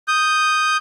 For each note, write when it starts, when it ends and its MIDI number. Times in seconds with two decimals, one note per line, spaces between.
0.08 0.77 87
0.08 0.77 91